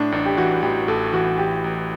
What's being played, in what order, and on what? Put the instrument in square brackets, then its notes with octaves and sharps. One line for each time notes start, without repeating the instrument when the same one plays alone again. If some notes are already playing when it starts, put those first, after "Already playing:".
Already playing: [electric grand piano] A2 [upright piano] D4
[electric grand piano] A1 [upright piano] D4
[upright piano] G4
[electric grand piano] E3 [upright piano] F#4
[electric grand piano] A1 [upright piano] G4
[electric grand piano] A1 [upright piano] A4
[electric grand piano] E3 [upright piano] F#4
[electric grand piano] A1 [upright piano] G4
[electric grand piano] A1